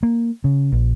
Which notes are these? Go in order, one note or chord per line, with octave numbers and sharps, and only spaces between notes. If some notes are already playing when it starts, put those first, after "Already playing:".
A#3
C#3
A#1